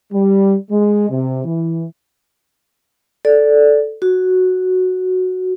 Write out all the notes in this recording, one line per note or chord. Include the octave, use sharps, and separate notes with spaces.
G3
G#3
C3
E3
A4 D5
F#4